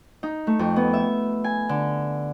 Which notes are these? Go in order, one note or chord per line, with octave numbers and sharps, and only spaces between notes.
D#4
A3
F2
B3
E5
G#5
D3